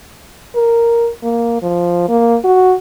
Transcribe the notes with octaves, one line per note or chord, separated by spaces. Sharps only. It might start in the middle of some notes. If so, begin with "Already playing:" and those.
A#4
A#3
F3
A#3
F#4